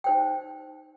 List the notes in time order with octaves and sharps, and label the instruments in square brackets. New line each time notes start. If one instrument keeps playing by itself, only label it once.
[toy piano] D#4 C5 G5